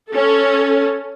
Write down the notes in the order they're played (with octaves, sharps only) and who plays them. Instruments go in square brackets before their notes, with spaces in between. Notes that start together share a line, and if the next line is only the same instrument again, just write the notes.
[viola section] C#4 A4